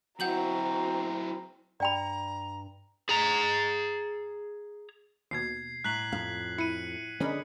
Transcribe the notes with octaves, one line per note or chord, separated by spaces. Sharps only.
F#3 C4 E4 F#4 F#5 A#5 G6 F#7
G2 D5 G5 A#5 B5
G#4 A#5
D#2 B2 G#6 C7
A2 A#5 F#6 B6 F#7
F2 F5
E4 C#7 D#7
D3 C#4 G#4 A#4 D#5 B5